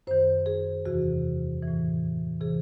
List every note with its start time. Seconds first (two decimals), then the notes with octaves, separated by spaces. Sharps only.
0.07 F#2 D#3 C5
0.46 G#4
0.85 E2 C3 E3 F#4
1.63 A2 E3
2.40 C3 E3 G#4